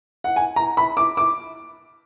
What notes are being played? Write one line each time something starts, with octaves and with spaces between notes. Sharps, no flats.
F#5
G#5
A#5
B5
D6
D6